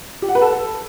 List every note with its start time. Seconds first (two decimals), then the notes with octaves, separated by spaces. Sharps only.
0.22 G4
0.29 F#5
0.35 B4
0.42 A4